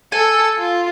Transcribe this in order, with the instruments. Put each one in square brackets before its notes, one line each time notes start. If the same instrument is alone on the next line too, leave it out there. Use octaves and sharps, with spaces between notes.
[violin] A4 E6 [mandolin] G#5
[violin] F4